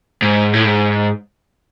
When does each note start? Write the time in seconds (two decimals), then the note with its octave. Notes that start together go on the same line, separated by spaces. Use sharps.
0.22 G#2
0.53 A2
0.65 G#2